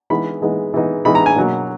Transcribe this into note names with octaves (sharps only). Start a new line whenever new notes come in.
E3 G#3 B3 D#4 B5
E3 G#3 B3 D#4
E3 G#3 B3 D#4
E3 G#3 B3 D#4 B5
A#5
G#5
B2 F#3 A#3